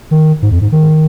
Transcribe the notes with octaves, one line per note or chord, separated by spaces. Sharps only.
D#3
G#2
F2
G#2
D#3